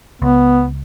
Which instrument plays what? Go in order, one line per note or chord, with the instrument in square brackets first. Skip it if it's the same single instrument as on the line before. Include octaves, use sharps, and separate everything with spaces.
[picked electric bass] C#2 [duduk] B3